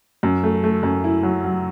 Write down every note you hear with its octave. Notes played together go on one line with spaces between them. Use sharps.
F#2
A3
A3
F#2
E4
F#3
F#3